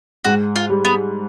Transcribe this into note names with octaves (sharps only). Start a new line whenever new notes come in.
G#2 F#4
F4
G3
B3